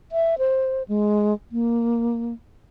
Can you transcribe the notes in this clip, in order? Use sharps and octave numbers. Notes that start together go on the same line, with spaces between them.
E5
C5
G#3
A#3